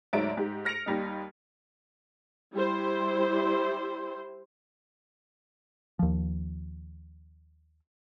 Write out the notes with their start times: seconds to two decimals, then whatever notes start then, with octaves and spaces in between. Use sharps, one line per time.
0.13 D2 G#2 F#3 D5 E5 D7
0.37 G#2 G4
0.65 F6 A#6 C#7 D7 F7
0.86 D#2 G3 D#4
2.54 G3 E4 C5
5.99 D#2 F3